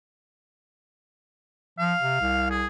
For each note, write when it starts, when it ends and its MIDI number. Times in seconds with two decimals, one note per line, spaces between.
1.79 1.94 53
1.79 2.48 77
2.02 2.18 48
2.20 2.65 36
2.51 2.67 68